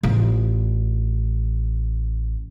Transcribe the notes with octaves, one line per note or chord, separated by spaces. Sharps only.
A1 F4